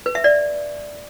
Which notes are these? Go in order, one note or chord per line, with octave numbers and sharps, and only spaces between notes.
B4
E5
D5